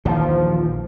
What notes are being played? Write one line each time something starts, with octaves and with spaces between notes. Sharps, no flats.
A#1 D#2 E3 F3